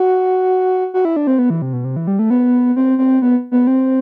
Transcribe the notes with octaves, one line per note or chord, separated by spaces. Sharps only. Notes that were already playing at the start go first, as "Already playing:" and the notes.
Already playing: F#4
F#4
E4
D4
C4
B3
E3
C3
B2
C3
E3
G3
A3
B3
C4
C4
B3
B3
C4